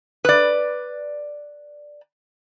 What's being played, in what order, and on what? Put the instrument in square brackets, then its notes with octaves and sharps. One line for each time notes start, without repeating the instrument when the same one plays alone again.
[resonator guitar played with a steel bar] B4 D5